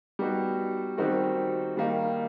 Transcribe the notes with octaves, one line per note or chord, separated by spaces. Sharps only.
G3 B3 D#4 F#4
D#3 G3 C4 D#4 F#4
D#3 G3 A#3 D#4